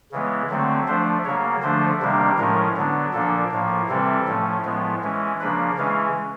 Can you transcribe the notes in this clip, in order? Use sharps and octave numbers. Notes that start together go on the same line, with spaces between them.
C#3 E3 G#3 B3
D3 F#3 A3 C4
F3 A3 D4 C5
C#3 F#3 A#3 C#5
D3 F3 A3 D4 C5
C3 D#3 G3 A#3 D4
A2 F3 G#3 C#4 A#4
D3 F#3 B3 D4
A#2 F3 A#3 D4 A4
A2 F3 A#3
C3 E3 G3 C4 A4
A2 F3 A3 C#4
A2 F3 G#3 B3
E3 G#3 C#4
C#3 F3 A#3 D4 B4
C#3 E3 G#3 C#4 F5